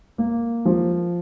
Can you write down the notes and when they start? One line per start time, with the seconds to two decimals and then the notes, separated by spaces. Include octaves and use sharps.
0.18 A#3
0.65 F3